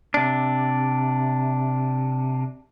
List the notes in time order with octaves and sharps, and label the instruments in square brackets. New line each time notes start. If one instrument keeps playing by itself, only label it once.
[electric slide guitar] C3 D4